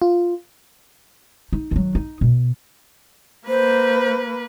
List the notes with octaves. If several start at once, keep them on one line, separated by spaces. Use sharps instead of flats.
F4
D#4
D#3 F#3
D#4
B2
A#3 B4 C5